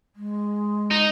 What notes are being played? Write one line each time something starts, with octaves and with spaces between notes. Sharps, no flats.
G#3
D#4